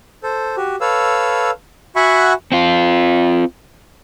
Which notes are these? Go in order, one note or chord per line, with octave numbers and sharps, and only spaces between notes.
A4 C5
F#4 G4
A4 B4 C#5 F5 E6
F#4 E5 F#5 G#5 B5 C#6
C4 F4